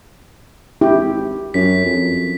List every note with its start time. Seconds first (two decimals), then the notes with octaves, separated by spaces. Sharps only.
0.81 G#1 E4 G4
1.54 F#2 B6
1.85 F2